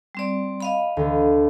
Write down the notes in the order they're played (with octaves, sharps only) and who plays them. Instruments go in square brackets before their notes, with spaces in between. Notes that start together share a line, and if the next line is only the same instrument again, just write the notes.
[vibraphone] G3 C4 D5
D#5 F5 B5
[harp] D2